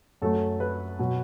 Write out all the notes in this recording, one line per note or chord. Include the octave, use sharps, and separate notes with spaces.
F#2 F#3 A3 A4
B4
B2 F#3